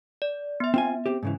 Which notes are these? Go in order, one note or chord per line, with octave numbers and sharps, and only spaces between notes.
D5
B3 E5
C4 F4 G#5
C4 G4
G#2 C#3 E3